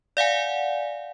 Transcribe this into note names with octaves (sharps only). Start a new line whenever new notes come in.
D5 F5 F#5 G#5